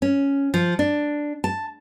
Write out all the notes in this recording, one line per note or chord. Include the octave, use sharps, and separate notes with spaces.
C#4
F3
D4
A5